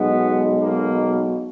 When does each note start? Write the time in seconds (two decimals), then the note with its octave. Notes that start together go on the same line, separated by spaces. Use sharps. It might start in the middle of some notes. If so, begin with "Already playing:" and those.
Already playing: B1 B2 G#3 B3
0.61 A#3